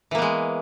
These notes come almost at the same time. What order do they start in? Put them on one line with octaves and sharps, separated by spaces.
E3 A#3 B3 G#3